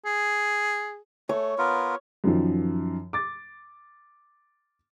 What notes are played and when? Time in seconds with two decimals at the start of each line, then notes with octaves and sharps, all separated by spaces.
0.06 G#4
1.29 A3 C#5
1.58 B3 F4 A#4
2.24 F#2 D#3 F3
3.13 D6 A6